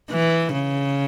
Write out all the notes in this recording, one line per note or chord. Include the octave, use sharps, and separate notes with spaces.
E3
C#3